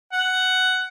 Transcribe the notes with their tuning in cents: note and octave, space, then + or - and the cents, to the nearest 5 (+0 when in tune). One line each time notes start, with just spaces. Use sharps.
F#5 +10